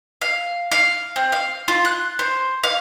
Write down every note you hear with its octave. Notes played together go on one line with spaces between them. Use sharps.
F5
F5
C4
F5
F4
F#6
C5
F5